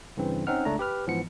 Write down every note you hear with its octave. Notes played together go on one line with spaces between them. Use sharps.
G2 C#3 E3 C4
C4 C#4 D#4 F#5 F6
C#2 A3 D4 A#5
G4 B4 F6
G#2 E3 F3 B3 C#7